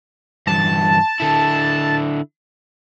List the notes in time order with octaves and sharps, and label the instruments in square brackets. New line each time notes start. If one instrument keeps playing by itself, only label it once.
[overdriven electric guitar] E2 G2 [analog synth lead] A5
[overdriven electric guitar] D3 E4